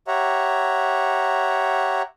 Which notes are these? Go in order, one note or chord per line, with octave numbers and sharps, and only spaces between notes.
G4 C#5 E5 F#5 A#5